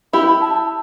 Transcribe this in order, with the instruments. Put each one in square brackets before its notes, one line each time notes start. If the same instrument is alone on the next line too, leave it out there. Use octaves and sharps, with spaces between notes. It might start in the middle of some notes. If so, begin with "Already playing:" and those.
[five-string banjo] E4 G4 [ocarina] B5
[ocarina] A5